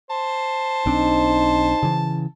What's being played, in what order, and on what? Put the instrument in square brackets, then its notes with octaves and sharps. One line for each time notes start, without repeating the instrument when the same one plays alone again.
[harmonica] C5 [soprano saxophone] A5
[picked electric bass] B1 C4 D4 [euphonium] D#4
[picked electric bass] C#3 E3